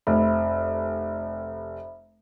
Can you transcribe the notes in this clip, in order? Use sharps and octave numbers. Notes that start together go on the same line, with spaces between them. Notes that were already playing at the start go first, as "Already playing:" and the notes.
F1 C5 E5 B5